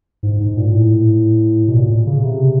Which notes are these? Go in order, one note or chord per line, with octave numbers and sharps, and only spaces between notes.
G#2
G#2
A#2
A2
B2
A#2
C#3
C3